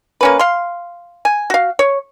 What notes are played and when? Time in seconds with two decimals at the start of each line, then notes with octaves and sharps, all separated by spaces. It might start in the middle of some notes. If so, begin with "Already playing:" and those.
0.21 A#3 C#4 B4
0.39 F5 C6
1.25 G#5
1.50 F#4 F5
1.79 C#5